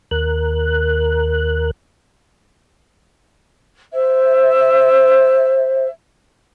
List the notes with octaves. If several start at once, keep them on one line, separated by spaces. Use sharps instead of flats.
D#2 A#4 F#6
C5 E5